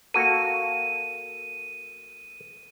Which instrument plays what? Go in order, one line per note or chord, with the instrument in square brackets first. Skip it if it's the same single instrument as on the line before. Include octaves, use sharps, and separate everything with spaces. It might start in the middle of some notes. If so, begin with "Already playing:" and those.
[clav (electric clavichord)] A#3 F#4 A4 [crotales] D#7